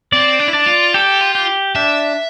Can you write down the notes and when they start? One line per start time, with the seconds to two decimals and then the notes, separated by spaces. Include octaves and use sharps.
0.12 C4 D5
0.39 D4
0.48 E4
0.53 D4 D5
0.67 F4
0.94 G4 A4
1.21 F4
1.35 G4
1.76 D4 E5